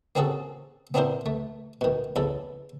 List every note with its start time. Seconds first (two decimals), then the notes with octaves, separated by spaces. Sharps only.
0.15 A#3 C4 C#4 F#4 G#4 A4
0.94 B3 C4 D4 E4 A#4 C5
1.26 A3
1.81 B2 D#3
2.16 E2 C#3 A4